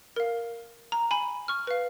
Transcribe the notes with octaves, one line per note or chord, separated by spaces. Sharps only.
A#4 F5
A#5
G#5 B5
C#6 F6
B4 F5